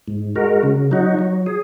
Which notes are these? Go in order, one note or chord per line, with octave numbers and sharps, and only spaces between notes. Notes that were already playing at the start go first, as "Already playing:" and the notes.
G#2
G#3 F#4 A#4
C#3
F#3 D#4 F#4
F#3
G#4